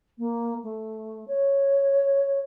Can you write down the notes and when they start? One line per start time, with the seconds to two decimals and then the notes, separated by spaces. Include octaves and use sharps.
0.18 A#3
0.63 A3
1.27 C#5